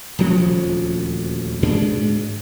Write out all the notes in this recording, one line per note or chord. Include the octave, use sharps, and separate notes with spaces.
D#1 D2 F3 C#4
D2 G#2 G#3 D4